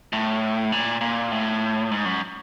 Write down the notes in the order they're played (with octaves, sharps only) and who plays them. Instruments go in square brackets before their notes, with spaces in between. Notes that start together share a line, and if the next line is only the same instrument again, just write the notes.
[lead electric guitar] A2
A#2
A#2
A2
G#2
F#2